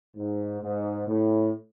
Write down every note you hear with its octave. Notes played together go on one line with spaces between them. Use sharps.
G#2
G#2
A2